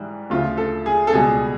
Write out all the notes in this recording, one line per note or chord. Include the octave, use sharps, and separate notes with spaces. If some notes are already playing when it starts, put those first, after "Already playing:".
Already playing: G#2 E3 G3
D2 C#3 F3 F4
A4
G#4
A4
C#2 B2 G3 G#4